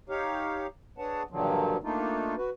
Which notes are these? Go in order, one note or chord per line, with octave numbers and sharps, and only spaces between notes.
D#4 G4 C#5 F5
D4 G#4 B4 C#5 F#5 A5
G2 A#2 D3 D#3 F3 F#3
A3 A#3 D4 D#4 F4
F#4 B4